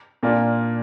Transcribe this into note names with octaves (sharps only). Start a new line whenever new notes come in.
A#2 A#3 D4 F4